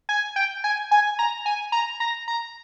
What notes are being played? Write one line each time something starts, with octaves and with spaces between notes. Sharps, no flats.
G#5
G5
G#5
G#5
A#5
G#5
A#5
A#5
A#5